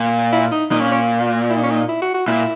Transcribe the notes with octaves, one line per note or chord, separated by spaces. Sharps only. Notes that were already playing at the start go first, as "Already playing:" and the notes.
Already playing: A#2
E4
D#4
A#2 D#4
C#4
C#4
E4
D#4
C#4
D#4
E4
F#4
F#4
A#2 E4